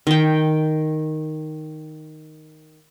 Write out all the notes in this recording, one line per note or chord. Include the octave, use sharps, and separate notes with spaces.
D#3 G5